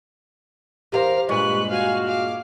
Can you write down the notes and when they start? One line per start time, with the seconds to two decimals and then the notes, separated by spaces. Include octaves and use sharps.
0.92 E2 F4 G4 A#4 C5 F5 A#5
1.29 G2 A#2 G#3 B4 C#6 F#6
1.70 F#4 F5 G#5 F6
2.07 F5 D6